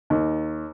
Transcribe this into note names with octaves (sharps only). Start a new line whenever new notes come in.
D#2